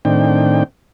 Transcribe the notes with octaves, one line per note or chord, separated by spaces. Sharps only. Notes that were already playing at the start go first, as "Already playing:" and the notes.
A2 D#3 C4 D4 G5